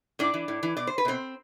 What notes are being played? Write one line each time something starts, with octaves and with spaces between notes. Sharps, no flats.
A2 D4 D5
E3
A2
E3
B2 D5
C5
B4
B2 C4 C5